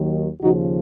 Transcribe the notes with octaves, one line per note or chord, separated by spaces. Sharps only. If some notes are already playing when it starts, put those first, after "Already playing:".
Already playing: D#2 D#3 F#3
D#2 C#3 F3 D#4 F#4